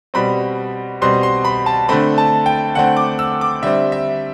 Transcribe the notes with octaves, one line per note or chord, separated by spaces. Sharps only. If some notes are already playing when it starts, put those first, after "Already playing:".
B2 G3 C4 B5
B2 G3 C4 C6
C6
B5
A5
D3 A3 C4 B5
A5
G5
D3 A3 C4 F#5
D6
E6
D6
D3 G3 C4 E5
E5